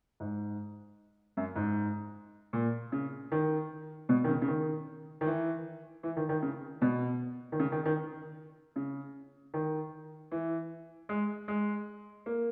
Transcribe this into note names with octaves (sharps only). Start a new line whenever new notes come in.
G#2
F#2
G#2
A#2
C#3
D#3
B2
D#3
C#3
C#3
D#3
D#3
E3
E3
D#3
D#3
C#3
B2
D#3
C#3
D#3
D#3
C#3
D#3
E3
G#3
G#3
A#3